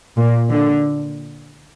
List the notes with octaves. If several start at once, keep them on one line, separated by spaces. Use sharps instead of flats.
A#2
D3